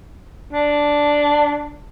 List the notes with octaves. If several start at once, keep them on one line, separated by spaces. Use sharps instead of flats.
D4